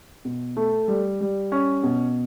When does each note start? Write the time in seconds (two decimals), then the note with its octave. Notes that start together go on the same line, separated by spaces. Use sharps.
0.25 B2
0.57 A3
0.88 G3
1.21 G3
1.52 C#4
1.83 B2